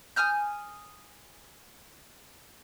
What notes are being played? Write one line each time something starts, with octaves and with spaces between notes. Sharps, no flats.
G#5 D#6 F6 G6